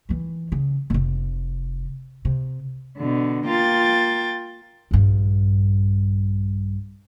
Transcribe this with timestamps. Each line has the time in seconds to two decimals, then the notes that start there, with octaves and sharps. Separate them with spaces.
0.09 D#3 E3
0.52 C#3
0.90 F1 C3
2.25 C3
2.97 B2 D3
3.46 A#3 F4 G5 A6
4.91 A#1 G2